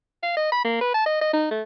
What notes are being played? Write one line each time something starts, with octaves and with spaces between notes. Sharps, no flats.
F5
D#5
B5
A#3
B4
A5
D#5
D#5
D#4
A3